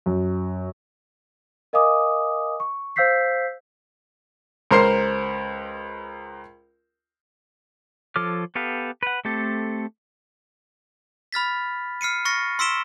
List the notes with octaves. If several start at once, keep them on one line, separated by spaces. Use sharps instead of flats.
F#2
A#4 D#5 F5 G#5 D6 D#6
C#6
C5 F5 E6 G6 B6 C7
C#2 A#4 C5 C6 C7
F3 A4 C#5 D6 F6
B3 G4 A4 B4 F5
B4 F#5
A3 C4 G4 A4
B5 F6 A6 B6
F6 C7 C#7 D#7
C#6 F6 A6 A#6 C#7
C6 E6 B6 D7 E7 G7